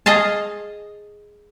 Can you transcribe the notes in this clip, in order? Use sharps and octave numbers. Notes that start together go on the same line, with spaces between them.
G#4 D#5 F5 A5